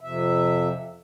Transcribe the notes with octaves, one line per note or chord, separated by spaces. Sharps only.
F2 C3 E5